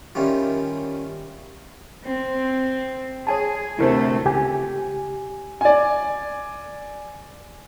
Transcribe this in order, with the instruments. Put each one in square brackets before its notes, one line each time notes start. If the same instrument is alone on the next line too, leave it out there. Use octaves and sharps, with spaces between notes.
[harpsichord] D#3 G3 C#4 E4 F4
[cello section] C4
[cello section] G#4 [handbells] C#5 G#5 A5
[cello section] D2 C3 A3 [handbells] E4 A#4 C5
[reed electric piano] C#2 G4 G#5
[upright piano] D5 G#5